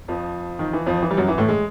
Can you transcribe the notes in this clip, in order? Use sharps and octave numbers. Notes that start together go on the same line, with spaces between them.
F2 F3
D#3
E3
F2 F3
E3
G3
F#2 F#3
E3
A2 A3
G#3